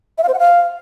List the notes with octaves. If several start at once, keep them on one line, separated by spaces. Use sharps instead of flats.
E5
F5
C5
F#5
F5